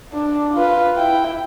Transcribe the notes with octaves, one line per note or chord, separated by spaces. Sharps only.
D4
F4 B4
E4 G5